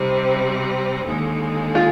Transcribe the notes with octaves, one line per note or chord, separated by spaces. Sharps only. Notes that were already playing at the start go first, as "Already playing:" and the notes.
Already playing: C3 G3 C4 D#4
D#2 D3 G#3
F4 G#4